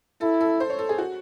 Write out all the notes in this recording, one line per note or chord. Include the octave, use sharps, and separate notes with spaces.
E4 A4
A4
C5
C#5
A4
G#4
F#4